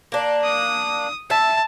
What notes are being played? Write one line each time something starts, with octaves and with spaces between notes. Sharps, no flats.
A#3 D4
D#6
E5 A5